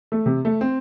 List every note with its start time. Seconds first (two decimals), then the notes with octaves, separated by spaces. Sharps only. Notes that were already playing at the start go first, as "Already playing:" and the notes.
0.12 A3
0.26 C3
0.45 A3
0.61 C4